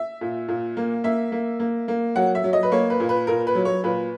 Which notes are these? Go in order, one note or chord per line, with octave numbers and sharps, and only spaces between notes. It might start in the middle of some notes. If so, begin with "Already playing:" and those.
Already playing: E5
A#2
A#2
A#3
A#3 E5
A#3
A#3
A#3
F#3 F#5
E5
F#3
D#5
B4
A#3 C#5
B4
A#2
B4
A#2 A#4
B4
F#3
C#5
A#2 B4